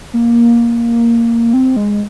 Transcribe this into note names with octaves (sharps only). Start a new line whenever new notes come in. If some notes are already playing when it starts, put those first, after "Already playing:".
A#3
C4
G#3